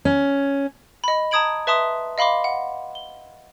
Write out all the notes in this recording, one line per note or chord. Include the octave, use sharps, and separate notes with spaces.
C#4
D#5 B5
A5 A#5 D#6 G#6 D7 F#7
B4 E5 A5 C6 D#6
D#5 F5 B5 C6 D6
F#5
G7